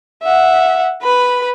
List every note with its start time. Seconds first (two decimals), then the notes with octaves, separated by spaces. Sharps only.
0.23 E5 F#5
1.02 B4 B5